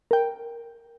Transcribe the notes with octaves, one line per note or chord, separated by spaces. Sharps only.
A#4 G5